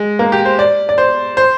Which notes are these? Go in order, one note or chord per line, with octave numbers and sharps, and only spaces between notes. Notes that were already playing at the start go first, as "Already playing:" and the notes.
Already playing: G#3
A#3
G4
C5
D5
D5
C5
C5